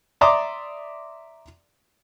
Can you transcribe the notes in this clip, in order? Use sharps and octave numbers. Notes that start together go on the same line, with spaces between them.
D5 E5 A#5 C6 D6 D#6